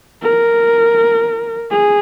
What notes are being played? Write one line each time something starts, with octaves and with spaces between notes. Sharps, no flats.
A#4
G#4